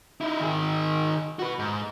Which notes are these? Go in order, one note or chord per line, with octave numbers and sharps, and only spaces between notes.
D#4 E4
D#3 G#4
F#4 B4
G#2